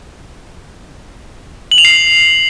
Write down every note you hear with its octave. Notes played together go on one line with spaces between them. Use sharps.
F#7
F7
C7